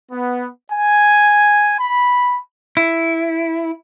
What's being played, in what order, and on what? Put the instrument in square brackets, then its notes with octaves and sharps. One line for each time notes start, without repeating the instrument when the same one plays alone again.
[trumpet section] B3
G#5
B5
[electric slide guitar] E4